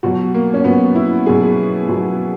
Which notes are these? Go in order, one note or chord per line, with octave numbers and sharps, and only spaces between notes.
B2 F#3 F#4
A#3
C#4
B2 F#3 B3
E4
B2 F#3 G#4
B2 F#3